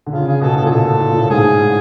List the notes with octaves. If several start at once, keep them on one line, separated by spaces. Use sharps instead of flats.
D3
C#3 F4
G#4
B2 A4
A2 A4
A#2 G#4
B2 A4
A2
A#2
A2
G#2 G#4
A2